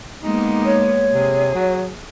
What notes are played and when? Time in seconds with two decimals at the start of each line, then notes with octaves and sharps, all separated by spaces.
0.23 G#3 A#3 B3 D#4
0.65 C#5
1.13 C3 G#4
1.55 F#3